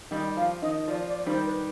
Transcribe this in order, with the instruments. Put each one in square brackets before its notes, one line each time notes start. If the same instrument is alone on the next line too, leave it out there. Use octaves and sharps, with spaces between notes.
[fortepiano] D#3 G3 [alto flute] D#5
[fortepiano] F3 [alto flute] F5
[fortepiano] D#3 [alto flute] D#5
[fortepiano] F3 [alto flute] D5
[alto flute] D5
[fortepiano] D#3 G3 [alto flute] C5
[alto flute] B4